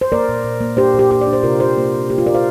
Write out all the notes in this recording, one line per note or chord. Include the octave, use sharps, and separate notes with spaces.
C5
A#3 A#4 D5
A#2
A#2
A#3
D4 G4 C5
A#2
G4
A#3 G4
D5
D4
C5
C3 F4 A#4
A#3 G4 C5
A#3
A#3
A#3 G4
F4
A#3 A#4 D5
C5 F5